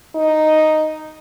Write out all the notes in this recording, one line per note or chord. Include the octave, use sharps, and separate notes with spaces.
D#4